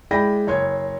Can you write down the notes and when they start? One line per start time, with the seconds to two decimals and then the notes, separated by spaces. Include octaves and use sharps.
0.11 G#3 E4 D5 G5 B5 A#6
0.47 F#1 C#5 C6 G#6